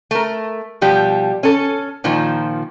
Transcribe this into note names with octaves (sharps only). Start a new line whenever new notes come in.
A3 A#4
B2 F3 G3 G4
C#4 A4
A#2 D#3 F3